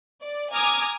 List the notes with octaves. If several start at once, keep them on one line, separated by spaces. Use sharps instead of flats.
D5
G#5 A#5 D6 D#6 F6 G#6